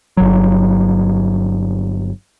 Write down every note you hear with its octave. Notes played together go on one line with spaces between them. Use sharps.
G1 F#3